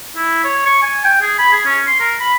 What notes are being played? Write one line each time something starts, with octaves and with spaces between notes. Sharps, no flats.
E4
C#5
C#6
G#5
G5
G#4
B5
G#4
C#4
C6
A#4
B5